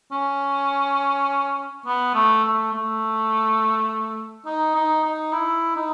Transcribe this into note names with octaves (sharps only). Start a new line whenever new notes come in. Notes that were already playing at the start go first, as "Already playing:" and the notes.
C#4
B3
A3
A3
A3
D#4
D#4
D#4
E4
D#4